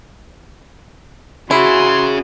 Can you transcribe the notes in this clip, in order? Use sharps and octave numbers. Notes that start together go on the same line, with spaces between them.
C#4 E4 F#4 G#4 C6